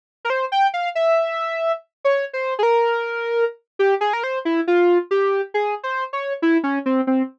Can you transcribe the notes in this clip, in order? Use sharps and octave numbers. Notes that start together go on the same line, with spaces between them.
A#4
C5
G5
F5
E5
C#5
C5
G#4
A#4
G4
G#4
A#4
C5
E4
F4
G4
G#4
C5
C#5
E4
C#4
C4
C4